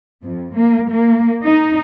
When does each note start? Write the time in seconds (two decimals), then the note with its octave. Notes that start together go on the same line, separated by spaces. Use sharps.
0.24 F2
0.56 A#3
0.90 A#3
1.44 D#4